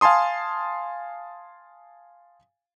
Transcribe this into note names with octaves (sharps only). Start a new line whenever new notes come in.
F5 G#5 A5 C6 D#6